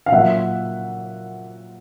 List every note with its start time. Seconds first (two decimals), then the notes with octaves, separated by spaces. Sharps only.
0.06 F5
0.12 A#2 F#3 A#3 E5 F#5